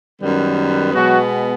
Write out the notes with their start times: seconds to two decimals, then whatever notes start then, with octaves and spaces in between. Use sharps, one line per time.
0.20 F#2 D#3 G3 B3
0.93 B2 F#3 G#3 B3 F#4